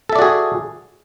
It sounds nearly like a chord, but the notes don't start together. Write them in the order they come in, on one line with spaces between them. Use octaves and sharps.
A4 E5 D5 F#4 G#4